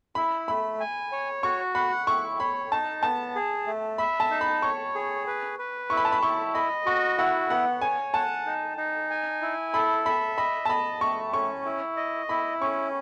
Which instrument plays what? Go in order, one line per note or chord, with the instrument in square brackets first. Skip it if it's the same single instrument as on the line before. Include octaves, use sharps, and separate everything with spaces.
[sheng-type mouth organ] E4 [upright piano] B5
[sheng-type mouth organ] A3 [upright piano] B5
[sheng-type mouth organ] G#5
C#5
[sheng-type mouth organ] F#4 [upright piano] C#6
[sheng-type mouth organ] F#5 [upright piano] B5
[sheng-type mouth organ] E4 [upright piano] C#6
[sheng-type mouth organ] C#5 [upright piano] B5
[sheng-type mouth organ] D#4 [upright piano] A5
[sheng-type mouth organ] B3 [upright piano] A5
[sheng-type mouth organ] G#4
A3
[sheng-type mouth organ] E5 [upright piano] B5
[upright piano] A5
[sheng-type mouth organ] D#4
[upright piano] B5
[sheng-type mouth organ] C#5 [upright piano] C#6
[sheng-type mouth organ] G#4
B4
B4
[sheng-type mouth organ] E4 [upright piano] C#6
[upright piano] B5
A5
B5
[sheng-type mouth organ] E4 [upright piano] C#6
[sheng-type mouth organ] D#5 [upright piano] B5
[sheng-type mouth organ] F#4 [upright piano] C#6
[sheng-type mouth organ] E4 [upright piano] F#5
[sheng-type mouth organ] B3 [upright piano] F#5
[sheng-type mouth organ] C#5 [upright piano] G#5
[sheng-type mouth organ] F#5 [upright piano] A5
[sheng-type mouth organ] D#4
D#4
G#5
E4
[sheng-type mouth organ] A4 [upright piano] B5
[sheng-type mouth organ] E5 [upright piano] B5
[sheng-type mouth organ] D#5 [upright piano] B5
[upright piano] A5
[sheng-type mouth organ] D#5 [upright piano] B5
[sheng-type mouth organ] A3 [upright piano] C#6
[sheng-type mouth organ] C#4 [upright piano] C#6
[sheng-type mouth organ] E4
D#5
[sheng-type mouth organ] E4 [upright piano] B5
[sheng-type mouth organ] C#4 [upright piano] C#6